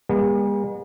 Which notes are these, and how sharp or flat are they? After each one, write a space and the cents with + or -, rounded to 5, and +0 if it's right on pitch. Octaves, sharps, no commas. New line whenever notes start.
G#3 -45 B3 -45